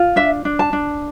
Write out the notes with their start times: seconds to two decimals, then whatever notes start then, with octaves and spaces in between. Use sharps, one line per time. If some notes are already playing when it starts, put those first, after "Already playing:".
Already playing: F4
0.16 D4 E5
0.45 D4
0.59 A5
0.73 D4